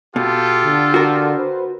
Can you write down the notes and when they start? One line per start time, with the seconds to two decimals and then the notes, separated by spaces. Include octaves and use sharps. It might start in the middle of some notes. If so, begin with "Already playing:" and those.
0.16 B2 F4 G4 A4
0.64 D3
0.94 F#4 A#4
1.36 B4 C5